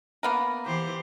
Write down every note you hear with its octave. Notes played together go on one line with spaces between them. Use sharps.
A#3 B3 A#4
E3 G4 C5